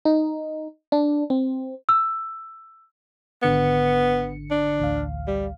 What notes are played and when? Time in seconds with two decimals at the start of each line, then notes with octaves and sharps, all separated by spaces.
0.05 D#4
0.92 D4
1.30 C4
1.89 E6
3.43 G#1 D3 B3 C#7
4.51 D4
4.80 A1 D2 F5
5.28 G3